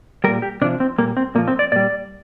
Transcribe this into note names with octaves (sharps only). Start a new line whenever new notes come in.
A#2 G3 A#4
G4
C3 F3 D4
C4
A#2 G3 A#3
C4
A#2 F3 A#3
C4
D5
A#2 G3 D5